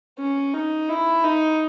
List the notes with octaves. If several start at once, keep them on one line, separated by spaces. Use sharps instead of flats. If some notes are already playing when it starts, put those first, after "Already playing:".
C#4
D#4
E4
D#4